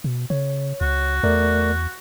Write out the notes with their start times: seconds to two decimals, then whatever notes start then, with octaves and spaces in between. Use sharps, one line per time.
0.04 B2
0.30 C#3 C#5
0.81 C#2 F#4
1.23 E2 A3 A#4 D5